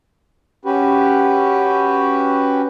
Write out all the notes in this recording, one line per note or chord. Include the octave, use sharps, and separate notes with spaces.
C#4 F#4 G4 B4